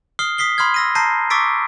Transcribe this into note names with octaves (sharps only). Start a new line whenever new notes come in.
D#6 F6 C7 G7
D#6 B6 C7 G7
B5 C6 D#6 F6 G#6
E6 A#6 D#7
A5 A#5 G6 A#6 C7 D#7
C#6 D6 E6 A6 B6 D7